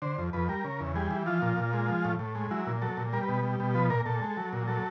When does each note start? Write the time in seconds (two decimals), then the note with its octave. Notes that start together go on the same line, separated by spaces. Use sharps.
0.02 D3 C5
0.18 F2
0.33 F2 B4
0.48 G3 A#4
0.64 C#3
0.80 E2
0.95 G3 G#4
1.11 E3
1.26 F3 F4
1.42 A#2
1.57 A#2
1.73 G#3
1.89 F3
2.05 A2
2.19 A2
2.35 G#3
2.51 F#3 E4
2.67 A#2
2.82 F#3 A4
2.97 A#2
3.13 G3 A#4
3.23 B4
3.28 B2
3.34 B4
3.43 G3
3.60 B2
3.75 F3 B4
3.90 A#2 A#4
4.06 A#2 A4
4.22 G#3
4.37 F#3
4.53 A#2
4.67 F#3 A4